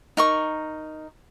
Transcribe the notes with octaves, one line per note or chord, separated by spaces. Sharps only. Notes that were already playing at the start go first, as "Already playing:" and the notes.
D#4 A#4 C#6